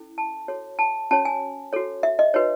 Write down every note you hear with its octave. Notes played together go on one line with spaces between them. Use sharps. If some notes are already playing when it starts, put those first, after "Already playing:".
Already playing: C#4 E4 A4
A5
F#4 A4 C#5
A5
C#4 F#4 C#5 A5
G#5
F#4 A4 C#5
E5
D#5
D#4 F#4 B4 C#5